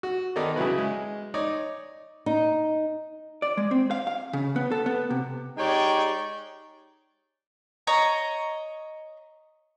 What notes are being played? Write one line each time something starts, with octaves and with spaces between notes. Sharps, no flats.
F#4
D#3 B3 D#4 A4 D5
C#3 F#3 E4 B4
G#3
D#4 C#5 D5
D#4
D5
G#3
C4
F5
F5
C#3
B3
A4
B3
C3
G#3 D#4 G4 C#5 D5 G5
C#5 D#5 A#5